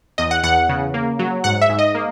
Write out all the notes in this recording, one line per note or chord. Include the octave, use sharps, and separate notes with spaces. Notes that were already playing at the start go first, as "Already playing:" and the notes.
E2 D#5
F#5
E2 F#5
C#3
A#3
F#3
G#2 F#5
E5
G#2
D#5
A#3